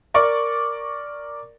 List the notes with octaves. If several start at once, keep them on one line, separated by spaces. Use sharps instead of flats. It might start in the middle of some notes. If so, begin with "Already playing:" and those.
A#4 D5 C#6 D6